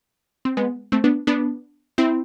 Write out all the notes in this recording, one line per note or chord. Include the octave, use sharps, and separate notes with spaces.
C4
G#3 B3
A3 C4
B3 D4
B3 D4
C4 E4